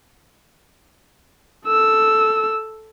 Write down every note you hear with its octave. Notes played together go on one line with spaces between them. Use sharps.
A4 E6